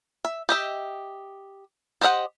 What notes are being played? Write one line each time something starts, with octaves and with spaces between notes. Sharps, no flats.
E5
G4 D#5 E5
G4 C5 D#5 E5 F#5